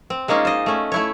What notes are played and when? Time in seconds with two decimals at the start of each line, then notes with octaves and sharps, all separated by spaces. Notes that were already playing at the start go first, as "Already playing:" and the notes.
0.10 C4
0.28 G#3 A#3 C#4 D#4 F4
0.45 C5 D#5
0.66 A3 C#4
0.92 A3 E4 C#5